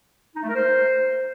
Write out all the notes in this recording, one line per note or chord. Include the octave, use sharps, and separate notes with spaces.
D#4
A3
A#4
C5